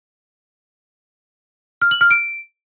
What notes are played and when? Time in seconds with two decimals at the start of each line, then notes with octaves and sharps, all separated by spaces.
1.82 F6
1.91 F#7
2.01 F6
2.11 D7